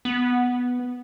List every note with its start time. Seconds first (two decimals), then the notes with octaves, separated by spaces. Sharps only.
0.05 B3